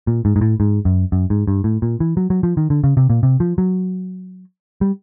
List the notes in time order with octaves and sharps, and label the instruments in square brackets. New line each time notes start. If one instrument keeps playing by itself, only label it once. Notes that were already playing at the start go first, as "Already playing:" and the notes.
[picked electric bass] A#2
G#2
G#2
A2
G#2
F#2
F#2
G#2
G2
A2
A#2
E3
F#3
F#3
F3
D#3
D3
C#3
C3
A#2
C3
F3
F#3
G3